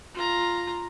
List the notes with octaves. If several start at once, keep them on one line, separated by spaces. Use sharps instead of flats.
F4 A#5